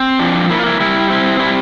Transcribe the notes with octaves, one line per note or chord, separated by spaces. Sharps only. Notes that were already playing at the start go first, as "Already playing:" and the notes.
Already playing: C4
F3 D4
A#3 E4
F4
E4
G3 E4
C4 E4
G3 E4